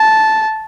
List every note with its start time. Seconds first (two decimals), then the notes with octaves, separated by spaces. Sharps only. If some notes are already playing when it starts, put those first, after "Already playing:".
Already playing: A5